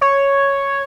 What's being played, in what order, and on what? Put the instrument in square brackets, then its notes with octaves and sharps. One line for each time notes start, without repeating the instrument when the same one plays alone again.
[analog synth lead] C#5